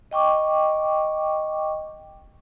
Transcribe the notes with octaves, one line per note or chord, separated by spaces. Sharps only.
D#5 G5 C#6 D6